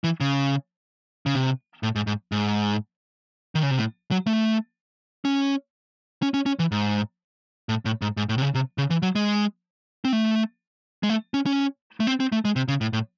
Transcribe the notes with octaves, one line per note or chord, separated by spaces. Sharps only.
E3
C#3
C#3
C3
A2
G#2
G#2
G#2
D#3
C#3
C3
A2
F#3
A3
C#4
C#4
C#4
C#4
E3
G#2
A2
A2
G#2
G#2
A2
C3
C#3
C3
C#3
E3
F#3
G#3
C4
A3
G#3
A3
C#4
C#4
A3
C4
C4
A3
G#3
C3
C#3
A2
A2